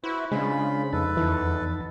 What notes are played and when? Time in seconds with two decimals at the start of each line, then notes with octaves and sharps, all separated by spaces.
0.04 E4 F#4 B4 C5
0.32 C#3 G#3 D4 F4 G#4 C5 B5
0.93 F2 D#4 A4 B4 A5
1.17 E2 D3 E3